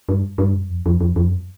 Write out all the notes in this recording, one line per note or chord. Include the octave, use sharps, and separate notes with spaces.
G2
G2
F#2
F2
F2
F2
F2
F#2